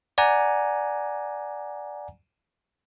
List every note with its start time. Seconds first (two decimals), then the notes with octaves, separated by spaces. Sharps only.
0.18 D5 F#5 G#5 A#5